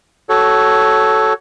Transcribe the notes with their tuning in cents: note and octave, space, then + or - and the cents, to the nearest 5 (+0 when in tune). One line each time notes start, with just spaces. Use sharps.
F#4 +20 A4 -10 C#5 +0